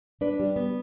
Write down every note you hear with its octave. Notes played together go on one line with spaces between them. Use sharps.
D4 B4 D5
G3
B3